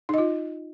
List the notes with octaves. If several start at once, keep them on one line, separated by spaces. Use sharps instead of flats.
D#4 F4 D#5